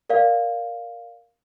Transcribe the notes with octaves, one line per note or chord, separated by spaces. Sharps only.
A#4 D5 F5